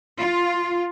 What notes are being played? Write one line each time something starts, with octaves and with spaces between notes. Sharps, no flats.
F4